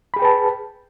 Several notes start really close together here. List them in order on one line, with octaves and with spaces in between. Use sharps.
B5 G#4 G5 B4 A5